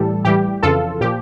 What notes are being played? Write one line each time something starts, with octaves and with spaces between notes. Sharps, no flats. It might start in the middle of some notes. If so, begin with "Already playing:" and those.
Already playing: A2 E3 G3 A4
A2 E3 G3 G4
F2 C#3 E3 F4 A4
A#2 F3 G4